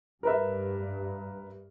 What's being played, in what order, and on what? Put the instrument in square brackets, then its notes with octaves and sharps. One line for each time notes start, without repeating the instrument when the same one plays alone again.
[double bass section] G2 [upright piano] A#4 B4 E5